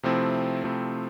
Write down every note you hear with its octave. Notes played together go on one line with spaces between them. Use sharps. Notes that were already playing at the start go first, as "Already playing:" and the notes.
C3 F3 A3 C4 E4
C3 F3 A3 C4 E4